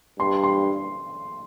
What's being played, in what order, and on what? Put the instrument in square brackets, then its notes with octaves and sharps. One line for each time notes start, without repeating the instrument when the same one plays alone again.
[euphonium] G2 [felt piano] C6
[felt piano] C6